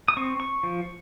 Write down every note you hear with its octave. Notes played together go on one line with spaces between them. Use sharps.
D#6
C4 C#6
C#6
F3